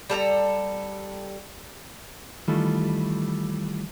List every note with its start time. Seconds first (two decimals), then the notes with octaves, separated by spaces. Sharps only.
0.10 G3 A4 F5 A#5
2.48 D#3 E3 G3 A3 F4 A4